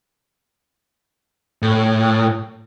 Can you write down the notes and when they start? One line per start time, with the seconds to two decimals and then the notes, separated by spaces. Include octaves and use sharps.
1.62 A2